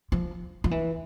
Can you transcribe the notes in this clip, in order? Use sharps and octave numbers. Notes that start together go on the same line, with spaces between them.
F3
F3
E3